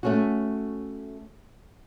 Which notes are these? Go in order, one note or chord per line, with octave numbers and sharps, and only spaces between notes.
A3 C#4 F#4